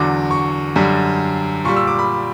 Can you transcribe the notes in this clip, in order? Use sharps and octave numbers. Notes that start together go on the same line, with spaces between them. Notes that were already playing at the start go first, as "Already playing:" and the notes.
Already playing: E2 D3 F#3 D6
C#6
F#2 D3 G3
A#2 G3 C#6
E6
D6
B5